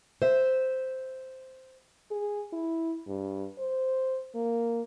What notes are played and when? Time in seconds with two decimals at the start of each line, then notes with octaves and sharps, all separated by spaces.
0.22 C5 E5
2.11 G#4
2.53 E4
3.07 G2
3.59 C5
4.35 A#3